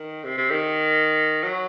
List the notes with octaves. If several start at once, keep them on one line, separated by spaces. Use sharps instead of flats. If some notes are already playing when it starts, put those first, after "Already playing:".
Already playing: D#3
C3
C3
D#3
F#3